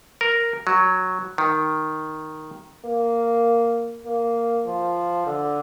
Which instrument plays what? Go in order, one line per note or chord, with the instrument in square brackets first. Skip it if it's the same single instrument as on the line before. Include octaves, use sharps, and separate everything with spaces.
[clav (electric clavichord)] A#4
F#3
D#3
[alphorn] A#3
A#3
F3
D3